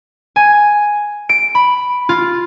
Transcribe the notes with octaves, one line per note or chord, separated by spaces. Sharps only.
G#5
D7
B5
F4